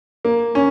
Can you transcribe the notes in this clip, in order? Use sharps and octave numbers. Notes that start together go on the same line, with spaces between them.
A#3
C#4